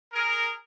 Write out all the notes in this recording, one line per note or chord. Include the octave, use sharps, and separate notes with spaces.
G#4 A#4